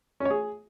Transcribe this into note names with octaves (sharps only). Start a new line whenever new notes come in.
C#4
C#5
G#4